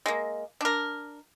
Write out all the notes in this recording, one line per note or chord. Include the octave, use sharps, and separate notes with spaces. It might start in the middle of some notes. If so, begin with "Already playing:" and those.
G#3 A#3
D4 A#4